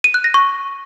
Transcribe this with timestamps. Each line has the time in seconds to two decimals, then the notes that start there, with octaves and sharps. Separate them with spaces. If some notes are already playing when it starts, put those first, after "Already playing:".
0.04 D#7
0.14 F#6
0.24 A#6
0.34 C#6